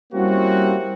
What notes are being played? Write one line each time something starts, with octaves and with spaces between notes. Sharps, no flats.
G3 A#3 C4 C#4 E4 F#4